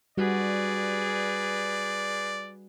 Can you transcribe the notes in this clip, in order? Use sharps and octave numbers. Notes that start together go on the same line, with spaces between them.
G3 F#4 G#4 B4 D5